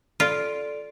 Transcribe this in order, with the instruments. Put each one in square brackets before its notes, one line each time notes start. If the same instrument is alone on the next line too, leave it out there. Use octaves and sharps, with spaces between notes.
[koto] F4 [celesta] A4 D5 D7